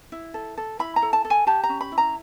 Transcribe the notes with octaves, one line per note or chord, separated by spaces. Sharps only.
E4
A4
A4
E4 B5
A#5
A4
A5
A4
G#5
G4 A5
A#5
C#4
B5
E4
A#5